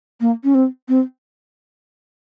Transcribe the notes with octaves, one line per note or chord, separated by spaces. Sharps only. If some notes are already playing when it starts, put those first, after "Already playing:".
A#3
C#4
C4
C4